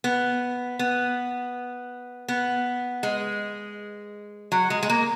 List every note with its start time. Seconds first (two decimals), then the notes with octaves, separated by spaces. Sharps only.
0.04 B3
0.79 B3
2.28 B3
3.03 G#3
4.52 F#3
4.70 G#3
4.83 G#3
4.90 A#3